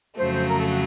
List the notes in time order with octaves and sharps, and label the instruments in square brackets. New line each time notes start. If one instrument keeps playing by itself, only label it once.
[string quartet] F2 C#3 F#3 A3 [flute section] C5
[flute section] C5
A#4
A4
F#4